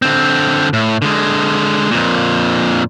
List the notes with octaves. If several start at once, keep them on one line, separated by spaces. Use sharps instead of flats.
D3 C4
A2
D3 G#3
F2 A#2